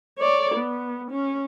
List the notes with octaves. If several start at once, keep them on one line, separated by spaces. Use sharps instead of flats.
C#5 D5
B3
C#4